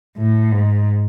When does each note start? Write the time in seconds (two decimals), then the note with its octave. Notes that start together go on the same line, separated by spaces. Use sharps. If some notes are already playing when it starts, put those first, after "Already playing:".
0.17 A2
0.51 G#2